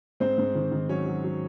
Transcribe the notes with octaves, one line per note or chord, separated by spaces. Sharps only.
G#2 C4 C5
G#2
D#3
D#3
F#3 C#4 C#5
F#3
F#3